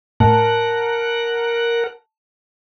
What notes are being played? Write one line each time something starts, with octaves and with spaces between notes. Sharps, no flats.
A2 A#4 F#5 A5